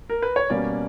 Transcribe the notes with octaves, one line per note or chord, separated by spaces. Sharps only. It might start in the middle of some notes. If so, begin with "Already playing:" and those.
A#4
B4
C#5
B2 G3 A#3 C#4 D5